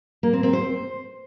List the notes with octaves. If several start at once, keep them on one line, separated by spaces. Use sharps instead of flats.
A#3
C4
C4
C5